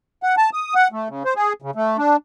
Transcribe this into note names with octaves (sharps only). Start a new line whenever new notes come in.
F#5
A5
D#6
F#5
A3
C#3
C5
G#4
C#3
A3
D4